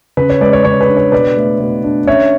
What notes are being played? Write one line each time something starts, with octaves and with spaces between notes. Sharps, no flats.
C#3 B4
C#5
G#3 B4 D5
C#5
C#3 C#5
B4
D4
C#5
B2 B4 D5
A3
B2
D4
C#4 C#5 E5